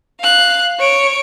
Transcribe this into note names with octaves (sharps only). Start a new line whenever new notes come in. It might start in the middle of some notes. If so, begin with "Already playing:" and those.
F5 F#6
C#5 D7